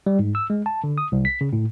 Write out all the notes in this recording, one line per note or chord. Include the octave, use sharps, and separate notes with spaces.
G3
G#2
E6
G#3
A5
D3
D#6
C2
B6
C#3
A2